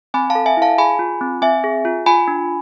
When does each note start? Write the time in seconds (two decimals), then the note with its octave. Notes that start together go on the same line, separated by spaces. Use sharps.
0.14 C4 G#5 B5
0.30 F5 A5
0.35 A4
0.46 E5 G#5
0.57 E4 F5 A5
0.78 G#4 G#5 B5
0.99 F4
1.21 C4
1.42 C4 E5 G#5
1.64 G#4
1.85 F4
2.06 F4 G#5 B5
2.28 D4